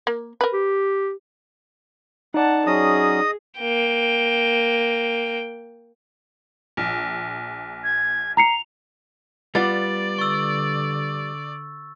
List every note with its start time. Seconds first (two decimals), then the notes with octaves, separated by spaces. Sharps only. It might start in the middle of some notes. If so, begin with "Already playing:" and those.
0.07 A#3
0.41 A#4 B4
0.53 G4
2.34 D#4 D5 F#5 A5
2.67 F#3 C#4 G#4 D#5 D#6
3.59 A#3 G5
6.77 A#1
7.84 G#6
8.37 A#5 C7 C#7 F7
9.55 G3 B3 F4 D5 A6
10.19 D3 C#6 E6